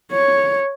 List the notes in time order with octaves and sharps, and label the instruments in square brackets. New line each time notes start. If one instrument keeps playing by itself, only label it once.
[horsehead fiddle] C#5